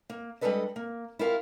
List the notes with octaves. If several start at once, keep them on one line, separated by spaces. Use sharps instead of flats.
A#3
G3 G#3 D4 A4 B4 D#5
A#3
E4 F4 G4 A#4 F5